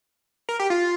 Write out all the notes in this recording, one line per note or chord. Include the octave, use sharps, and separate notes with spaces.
A#4
G4
F4